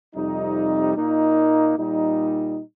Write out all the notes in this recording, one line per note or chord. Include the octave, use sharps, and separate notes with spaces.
F2 C3 G3 D#4
A#2 A#3 D#4
A#2 G3 D#4